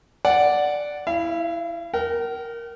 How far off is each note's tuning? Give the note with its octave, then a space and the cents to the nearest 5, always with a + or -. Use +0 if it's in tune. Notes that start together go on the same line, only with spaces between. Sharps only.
D5 +0 F#5 +0
E4 +0 F5 -40
A#4 +0 G5 -45